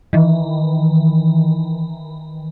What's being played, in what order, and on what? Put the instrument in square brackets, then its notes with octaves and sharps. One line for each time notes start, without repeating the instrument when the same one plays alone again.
[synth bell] D#3 E3